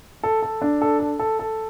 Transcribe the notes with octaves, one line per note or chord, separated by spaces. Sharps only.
A4
A4
D4
A4
A4
A4
A4